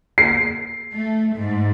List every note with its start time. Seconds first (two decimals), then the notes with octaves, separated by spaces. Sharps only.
0.18 C7
0.92 A3
1.35 G#2